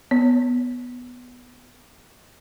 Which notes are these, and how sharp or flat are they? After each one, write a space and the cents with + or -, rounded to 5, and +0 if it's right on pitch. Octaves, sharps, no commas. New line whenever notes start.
B3 +0 C#5 +15